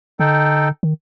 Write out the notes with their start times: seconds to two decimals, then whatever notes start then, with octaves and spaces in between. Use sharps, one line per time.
0.20 D3 D#4 A4 G5
0.83 D#3